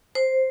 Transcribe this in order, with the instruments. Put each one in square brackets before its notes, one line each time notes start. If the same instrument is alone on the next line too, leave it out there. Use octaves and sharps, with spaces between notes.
[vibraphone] C5